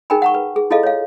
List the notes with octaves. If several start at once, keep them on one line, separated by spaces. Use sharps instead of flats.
D#4 G#4 A#4 G5 G#5 B5
F#5 A#5 C#6
B4
G#4
E4 F4 G#4 A4 D#5 F5
C#5 F5